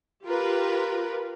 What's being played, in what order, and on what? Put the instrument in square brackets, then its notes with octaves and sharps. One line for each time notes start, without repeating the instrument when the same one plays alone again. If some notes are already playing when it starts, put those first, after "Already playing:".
[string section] F4 G4 A#4 B4